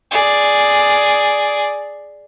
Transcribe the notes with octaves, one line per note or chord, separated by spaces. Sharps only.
G#4 D5